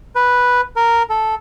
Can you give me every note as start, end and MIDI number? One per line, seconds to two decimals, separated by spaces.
0.15 0.61 71
0.76 1.03 70
1.10 1.35 69